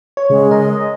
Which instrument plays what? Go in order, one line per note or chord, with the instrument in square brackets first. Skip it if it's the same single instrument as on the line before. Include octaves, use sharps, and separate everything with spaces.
[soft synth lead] C#5
[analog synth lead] C#3 [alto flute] G#3
[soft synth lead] A#4 [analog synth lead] D#5